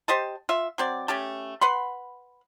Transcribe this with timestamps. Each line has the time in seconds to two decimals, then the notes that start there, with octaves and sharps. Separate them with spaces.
0.08 G4 C5 D#5 A5
0.49 F4 E5
0.78 F#3 C4 D5
1.08 A3 C#4 G4 A5
1.61 B4 F#5 B5 C6